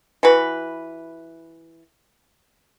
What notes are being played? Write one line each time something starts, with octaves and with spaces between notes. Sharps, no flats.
E3 F#4 B4